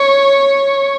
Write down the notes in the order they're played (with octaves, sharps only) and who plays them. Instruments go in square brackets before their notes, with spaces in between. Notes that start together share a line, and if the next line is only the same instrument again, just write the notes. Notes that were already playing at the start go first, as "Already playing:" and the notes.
Already playing: [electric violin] C#5